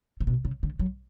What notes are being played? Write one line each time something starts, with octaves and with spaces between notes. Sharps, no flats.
C#3
B2
C#3
D3
F#3